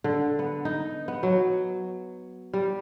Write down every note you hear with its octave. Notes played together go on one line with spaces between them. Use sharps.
D3
B3
D#4
B3
F#3
G3